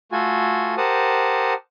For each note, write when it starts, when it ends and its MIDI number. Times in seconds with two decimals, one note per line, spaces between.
0.12 0.75 57
0.12 0.75 65
0.12 0.75 66
0.12 0.75 69
0.12 0.75 80
0.77 1.54 67
0.77 1.54 70
0.77 1.54 72
0.77 1.54 78
0.77 1.54 81
0.77 1.54 87